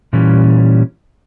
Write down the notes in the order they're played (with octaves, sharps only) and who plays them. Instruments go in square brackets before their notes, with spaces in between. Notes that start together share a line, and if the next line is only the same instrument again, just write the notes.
[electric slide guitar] A#2 E3 G3 C#4